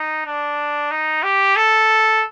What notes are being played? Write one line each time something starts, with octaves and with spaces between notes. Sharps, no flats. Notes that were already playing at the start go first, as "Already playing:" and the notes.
Already playing: D#4
D4
D#4
G4
A4